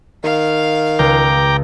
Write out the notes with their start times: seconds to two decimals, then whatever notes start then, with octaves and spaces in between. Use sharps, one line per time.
0.24 D#3 F5
0.99 C#2 G5 A#5 D6